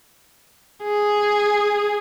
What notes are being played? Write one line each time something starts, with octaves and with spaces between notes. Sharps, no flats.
G#4